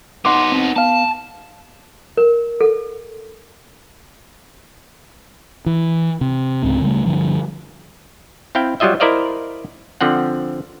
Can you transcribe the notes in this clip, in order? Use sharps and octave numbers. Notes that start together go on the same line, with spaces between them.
B3 D#4 F#5 C6 D6
C4
B3 F5 A5
A#4
A4
E3
C3
C#2 G#2 C4
C#3 G3 A3
G2 D3 F3
C4 E4 F5 G5
F#3 G3 F4 D#5 E5
E4 A#4 C5 D5 D#5 F5
D3 F3 C4 F#5